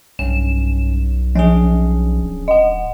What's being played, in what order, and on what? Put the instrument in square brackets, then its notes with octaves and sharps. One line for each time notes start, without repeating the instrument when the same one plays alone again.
[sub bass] B1 [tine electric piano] G2 C#4 [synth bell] E7
[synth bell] F3 [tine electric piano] C#4 D4 G#4
[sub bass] D1
[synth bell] D#5 F#5